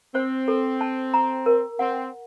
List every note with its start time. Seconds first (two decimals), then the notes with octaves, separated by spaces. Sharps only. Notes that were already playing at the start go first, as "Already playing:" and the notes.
0.15 C4 C5
0.48 A4
0.81 A5
1.14 A#5
1.46 A#4
1.79 C4 F#5